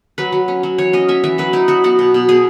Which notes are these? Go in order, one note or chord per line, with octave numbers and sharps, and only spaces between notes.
F#3 B4
F#3
C#4
F#3
E3 C#5
C#4 D#5
C#4 E5
E3 E5
F#3 B4
D#4 E4
F#3 F#4
B3 F#4
B2
B2
B2 G#4